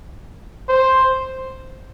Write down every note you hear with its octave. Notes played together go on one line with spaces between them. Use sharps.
C5